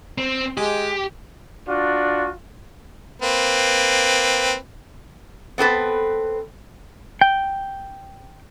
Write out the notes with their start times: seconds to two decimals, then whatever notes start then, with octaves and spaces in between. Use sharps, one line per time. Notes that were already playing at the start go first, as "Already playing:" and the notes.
0.18 C4
0.57 G#3 G4 D#5
1.67 D4 F4 F#4
3.22 A#3 C4 B4
5.58 B3 C4 A4 B4
7.21 G5